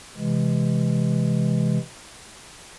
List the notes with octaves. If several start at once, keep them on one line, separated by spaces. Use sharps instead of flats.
C3 E3 G#3